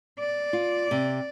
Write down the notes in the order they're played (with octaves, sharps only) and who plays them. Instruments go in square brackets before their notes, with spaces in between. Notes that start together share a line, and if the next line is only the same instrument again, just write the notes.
[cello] D5
[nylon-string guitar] F4
C3